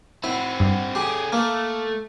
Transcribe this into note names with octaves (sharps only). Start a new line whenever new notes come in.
C4 E4 F#4
G2
D3 G4 G#4
A3 A#3